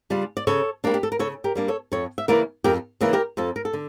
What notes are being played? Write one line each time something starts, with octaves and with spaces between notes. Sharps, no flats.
C#3 G3 D4 F4
D5
C#3 A4 C#5
G3 A#3 D4
G4
A4
A#4
C#3 A4 C#5
G4 A#4
G3 A#3 D4
A4 C#5
F2 A4 C#5
E5
C#3 E3 A#3 E4 A#4 D5
F2 G4 A#4
C#3 E3 A#3 E4
G4 A#4
F2 F4 A4
A#4
A4
D3